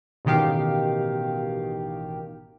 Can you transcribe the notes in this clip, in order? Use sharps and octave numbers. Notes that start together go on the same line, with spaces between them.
A1 B2 D#3 G4 F5